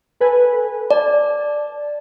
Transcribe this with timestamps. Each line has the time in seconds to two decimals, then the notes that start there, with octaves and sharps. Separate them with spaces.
0.20 A4 B4 G#5
0.91 D5 A5